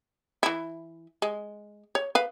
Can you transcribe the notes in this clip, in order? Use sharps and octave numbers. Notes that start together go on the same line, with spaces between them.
E3 E4
G#3
C#5
B4 F5